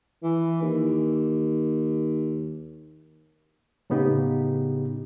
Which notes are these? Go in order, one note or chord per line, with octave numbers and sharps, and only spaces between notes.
E3
D#2
A2 C#3 B3 D#4 G4